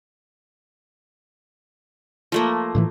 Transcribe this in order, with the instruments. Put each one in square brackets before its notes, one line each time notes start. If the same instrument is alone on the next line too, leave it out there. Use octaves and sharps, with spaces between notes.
[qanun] F3 A3 A#3
[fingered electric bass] A2 D#3 E3